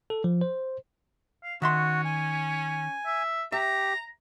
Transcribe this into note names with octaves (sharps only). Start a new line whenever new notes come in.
A4
F3
C5
F5
D#3 C#4 F#4 E5 C6
G#5
E5
G4 E5 A#5